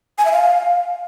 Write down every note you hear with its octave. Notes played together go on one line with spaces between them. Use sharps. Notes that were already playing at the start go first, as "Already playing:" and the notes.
G#5
E5
F5